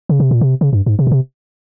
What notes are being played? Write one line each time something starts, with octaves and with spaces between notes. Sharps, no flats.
C#3
C3
A#2
C3
C#3
G2
G#2
C3
A#2
C3